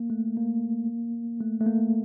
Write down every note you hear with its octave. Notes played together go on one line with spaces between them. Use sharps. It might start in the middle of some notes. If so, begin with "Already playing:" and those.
Already playing: A#3
A3
A#3
A3
A3
A#3